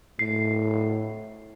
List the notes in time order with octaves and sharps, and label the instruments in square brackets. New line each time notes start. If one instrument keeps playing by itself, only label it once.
[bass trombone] A2 [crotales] C7